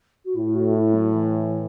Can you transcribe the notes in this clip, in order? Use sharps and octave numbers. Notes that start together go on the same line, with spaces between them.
F#4
A2 E4
F#4
E4
F#3
E3